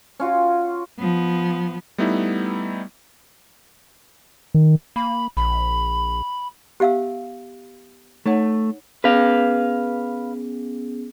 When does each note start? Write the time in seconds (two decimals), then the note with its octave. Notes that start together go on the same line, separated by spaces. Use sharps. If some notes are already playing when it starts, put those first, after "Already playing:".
0.20 C#4 F4 F#4
0.99 F3 B3
1.98 G3 A3 B3 D#4 E4
4.54 D#3
4.96 A#3 B5
5.37 A#1 B5
6.80 B3 G4 E5 F5 E6
8.26 A3 D#4 C#5 F#5
9.04 B3 C#4 G#4 B4 F5